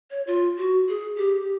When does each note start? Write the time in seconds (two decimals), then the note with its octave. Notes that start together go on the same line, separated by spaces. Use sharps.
0.11 C#5
0.27 F4
0.58 F#4
0.89 G#4
1.17 G4